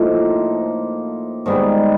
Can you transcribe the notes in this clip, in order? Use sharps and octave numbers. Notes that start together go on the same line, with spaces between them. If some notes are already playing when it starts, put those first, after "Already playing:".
Already playing: A2 F3 A#3 D#4
G#2 D#3 G3 B3